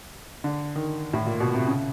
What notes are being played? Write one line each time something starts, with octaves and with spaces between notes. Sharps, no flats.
D3
D#3
A2
A#2
B2
C3
C#3